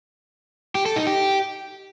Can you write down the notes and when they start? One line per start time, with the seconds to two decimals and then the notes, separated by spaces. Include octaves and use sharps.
0.75 G4
0.86 A4
0.96 D#4
1.07 G4